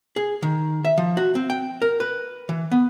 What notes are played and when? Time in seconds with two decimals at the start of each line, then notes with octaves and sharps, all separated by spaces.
0.16 G#4
0.42 D#3
0.85 E5
0.97 F3
1.17 F#4
1.35 C4
1.50 G5
1.82 A#4
2.00 B4
2.49 E3
2.71 B3